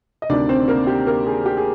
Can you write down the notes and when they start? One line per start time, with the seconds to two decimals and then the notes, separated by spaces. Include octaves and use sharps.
0.22 D#5
0.29 D2 C3 D#3 D4 D5
0.49 C4 C5
0.68 A#3 A#4
0.87 G4
1.07 A#3 A#4
1.26 G#4
1.46 G4
1.57 G#4